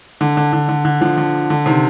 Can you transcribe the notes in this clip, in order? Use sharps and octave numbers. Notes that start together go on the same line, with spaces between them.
D3
D3
D3
D3
D3
D3 F3
D3
D3
C3 D#3